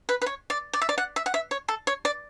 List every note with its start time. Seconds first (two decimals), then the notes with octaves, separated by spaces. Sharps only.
0.09 B4
0.22 B4
0.26 C#5
0.50 D5
0.73 D5
0.82 E5
0.89 D5
0.98 F#5
1.16 E5
1.26 F#5
1.34 E5
1.51 C#5
1.68 A4
1.87 C#5
2.05 D5